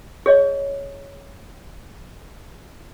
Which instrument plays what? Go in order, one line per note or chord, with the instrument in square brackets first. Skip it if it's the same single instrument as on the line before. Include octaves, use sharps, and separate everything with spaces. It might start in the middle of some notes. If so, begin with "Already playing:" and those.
[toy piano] G#4 C#5 D#5